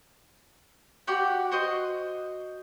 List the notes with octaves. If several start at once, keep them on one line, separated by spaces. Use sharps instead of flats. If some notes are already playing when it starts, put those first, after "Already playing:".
F#4 G4 D5 F#5
F#4 C5 D#5